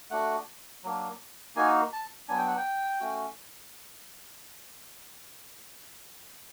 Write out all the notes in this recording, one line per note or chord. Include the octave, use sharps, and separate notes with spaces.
A3 D4 F#4 F#5
F#3 A#3 D4
A#3 D#4 F#4 G#5
A5
F#3 B3 D4 G#5
G5
F#5
G5
A3 C#4 F#4